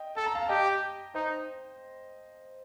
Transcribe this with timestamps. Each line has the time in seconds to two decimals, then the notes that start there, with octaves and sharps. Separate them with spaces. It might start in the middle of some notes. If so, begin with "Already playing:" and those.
Already playing: D#5 G5
0.17 A4 A5
0.26 A#5
0.35 F5 A5
0.49 G4 D#5 G5
1.15 D#4 C5 D#5